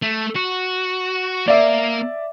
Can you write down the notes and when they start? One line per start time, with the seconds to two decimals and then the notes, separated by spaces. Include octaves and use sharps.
0.02 A3
0.36 F#4
1.48 A#3 D5 E5